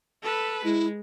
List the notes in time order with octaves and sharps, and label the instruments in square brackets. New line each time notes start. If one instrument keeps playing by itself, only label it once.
[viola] A4 B4
[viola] G#3 [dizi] E4